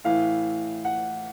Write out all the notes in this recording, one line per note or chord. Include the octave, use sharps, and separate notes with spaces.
A2 E3 F5
F#5